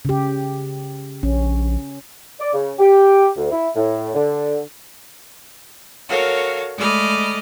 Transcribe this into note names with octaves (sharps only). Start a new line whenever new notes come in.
C#3 G4
A#1 C#4
D5
C#3
G4
D2
E4
A2
D3
F#4 A4 A#4 C#5 F5
G#3 A3 D5 D#5 B5 F6